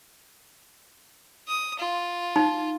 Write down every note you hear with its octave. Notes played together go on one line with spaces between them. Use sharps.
D#6
F4
D#4